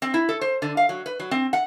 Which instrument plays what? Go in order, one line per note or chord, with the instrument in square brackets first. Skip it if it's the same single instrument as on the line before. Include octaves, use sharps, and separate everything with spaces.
[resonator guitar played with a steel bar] C4
E4
A4
C5
D3
F5
F#3
B4
F#3
C4
F#5